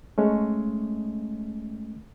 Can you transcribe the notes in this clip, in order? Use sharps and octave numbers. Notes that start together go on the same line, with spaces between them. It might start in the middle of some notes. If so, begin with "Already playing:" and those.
G#3 A3 C#4